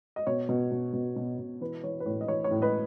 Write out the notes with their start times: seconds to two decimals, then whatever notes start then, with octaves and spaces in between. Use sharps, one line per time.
0.16 D#5
0.27 B2 C#5
0.49 B2
0.71 B2
0.93 B2
1.16 B2
1.39 B2
1.61 E3 B4
1.84 E3 C#5
2.00 B4
2.06 A2 C#5
2.21 D#5
2.28 E3 C#5
2.44 C#5
2.51 A2
2.62 B4 D#5